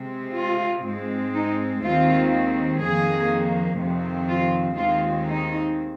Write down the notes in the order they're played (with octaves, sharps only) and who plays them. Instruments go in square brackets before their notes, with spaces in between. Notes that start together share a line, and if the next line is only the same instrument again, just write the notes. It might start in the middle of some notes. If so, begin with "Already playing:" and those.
Already playing: [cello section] C3 G#3 C4
F4
G#2 G#3 C4
D#4
D#2 D#3 G#3 C4 F4
F2 D#3 A#3 G#4
F2 C3 D#3 C4
F4
D#2 D#3 G#3 C4 F4
D#4